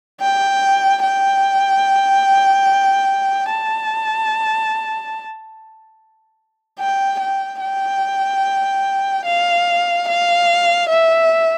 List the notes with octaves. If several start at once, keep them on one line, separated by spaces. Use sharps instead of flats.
G5
G5
A5
G5
G5
G5
F5
F5
E5